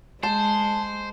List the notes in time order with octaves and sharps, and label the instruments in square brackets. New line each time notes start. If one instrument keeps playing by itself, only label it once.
[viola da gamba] G#3 [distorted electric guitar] C5 [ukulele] A5